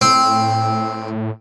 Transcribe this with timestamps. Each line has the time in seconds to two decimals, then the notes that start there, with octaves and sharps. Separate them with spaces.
0.01 A2 C4